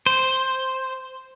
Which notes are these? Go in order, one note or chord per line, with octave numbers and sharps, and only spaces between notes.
C5